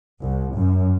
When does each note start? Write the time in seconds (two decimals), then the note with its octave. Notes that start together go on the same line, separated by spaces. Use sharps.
0.22 C2
0.55 F#2